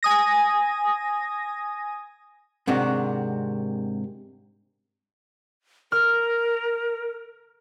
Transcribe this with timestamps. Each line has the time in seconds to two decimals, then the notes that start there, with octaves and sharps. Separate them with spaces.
0.03 G#5 D#6 A#6
2.67 G#2 C3 D#3 D4 F#4
5.92 A#4 F6